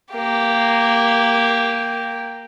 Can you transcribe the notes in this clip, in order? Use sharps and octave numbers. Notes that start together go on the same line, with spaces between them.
A#3 G4